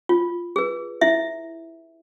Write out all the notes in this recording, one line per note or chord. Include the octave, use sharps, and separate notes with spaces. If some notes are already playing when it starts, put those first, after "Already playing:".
F4
G#4 B4
E4 E5